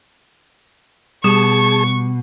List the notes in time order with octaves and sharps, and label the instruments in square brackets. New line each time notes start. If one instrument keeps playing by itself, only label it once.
[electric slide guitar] B2 [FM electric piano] G3 [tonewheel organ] G#4 A5 [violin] C#6